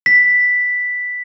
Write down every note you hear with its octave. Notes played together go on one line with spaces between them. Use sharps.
B6